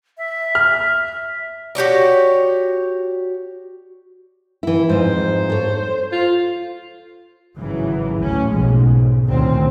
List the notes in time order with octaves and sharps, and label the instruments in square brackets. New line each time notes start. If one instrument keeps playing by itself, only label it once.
[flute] E5
[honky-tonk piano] F6
[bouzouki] F#4 G4 C#5 D5
[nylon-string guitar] E3 E4
[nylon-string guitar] F2 G#2 [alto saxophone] C5
[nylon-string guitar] A4 C#5
[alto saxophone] F4
[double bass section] G#1 C#3 E3 F#3
A1 D2 A2 C#4
B1 G#2 F3 G#3
C#3
D2 A#2 D#3 C4 C#4